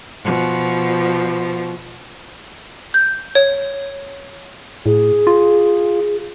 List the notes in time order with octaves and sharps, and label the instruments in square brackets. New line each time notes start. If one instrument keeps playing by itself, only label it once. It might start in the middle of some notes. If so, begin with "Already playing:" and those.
[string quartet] B2 F3
[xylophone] G6
C#5
[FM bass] A2 [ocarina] G#4
[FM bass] F4